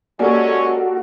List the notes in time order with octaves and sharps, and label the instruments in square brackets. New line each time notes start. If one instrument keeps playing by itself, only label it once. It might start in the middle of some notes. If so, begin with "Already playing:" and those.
[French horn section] G#3 C#4 [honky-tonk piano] A#3 G4 A4 [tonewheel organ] F#4 [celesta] D5 G#5